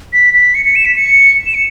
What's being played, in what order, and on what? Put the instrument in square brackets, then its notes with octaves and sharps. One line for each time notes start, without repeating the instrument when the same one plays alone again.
[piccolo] B6
B6
C#7
C#7
E7
B6
C#7
E7
C#7